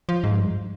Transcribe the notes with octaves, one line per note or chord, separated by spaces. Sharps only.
F3
G#2
G2